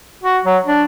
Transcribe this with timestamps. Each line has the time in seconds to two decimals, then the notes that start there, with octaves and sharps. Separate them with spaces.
0.24 F#4
0.45 F#3
0.65 D4